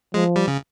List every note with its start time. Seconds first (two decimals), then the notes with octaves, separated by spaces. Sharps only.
0.14 F3 G#3
0.36 G3
0.47 C#3